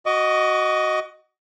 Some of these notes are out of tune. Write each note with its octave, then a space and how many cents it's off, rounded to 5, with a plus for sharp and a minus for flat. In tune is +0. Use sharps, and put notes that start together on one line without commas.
F#4 +0 D#5 +0 C#6 +45